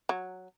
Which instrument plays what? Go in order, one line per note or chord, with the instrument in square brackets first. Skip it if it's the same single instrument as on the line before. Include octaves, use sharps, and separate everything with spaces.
[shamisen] F#3